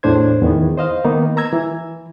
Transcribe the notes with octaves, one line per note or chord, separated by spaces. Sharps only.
E2 A2 D4 C5 G#6
E2 D#3 B3
C5 D#5 F5
D#3 A#3 B3 D#4
A#5 E6 G#6
E3